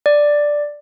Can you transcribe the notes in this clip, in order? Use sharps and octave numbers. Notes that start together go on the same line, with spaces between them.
D5